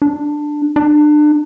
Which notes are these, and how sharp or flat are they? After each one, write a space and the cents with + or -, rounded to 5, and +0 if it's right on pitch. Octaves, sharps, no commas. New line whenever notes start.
D4 +10
D4 +30